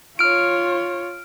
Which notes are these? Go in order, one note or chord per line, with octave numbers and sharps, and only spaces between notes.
F4 C#5 F6 D7